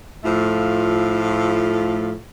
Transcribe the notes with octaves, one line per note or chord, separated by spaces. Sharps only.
A2 F3 A3 F4